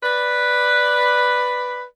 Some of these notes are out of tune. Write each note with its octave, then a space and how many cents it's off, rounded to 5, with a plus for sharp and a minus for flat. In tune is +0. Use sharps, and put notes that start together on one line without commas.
B4 +0 D5 +5